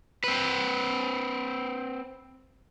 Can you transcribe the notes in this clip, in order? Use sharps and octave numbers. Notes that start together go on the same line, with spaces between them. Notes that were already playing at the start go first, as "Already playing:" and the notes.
C4 B4